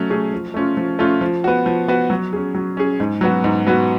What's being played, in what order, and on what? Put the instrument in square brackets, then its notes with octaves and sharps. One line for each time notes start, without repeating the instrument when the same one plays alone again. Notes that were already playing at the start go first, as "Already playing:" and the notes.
Already playing: [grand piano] F#3 A3 C#4
A3 C#4 G#4
F3
A3 C#4 F4
F3
A3 C#4 F4
F3
B3 F#4
F3
B3 F#4
F#3
C#4 G#4
F#3
C#4 G#4
G#2
F#3 B3 F#4
G#2
F#3 B3 F#4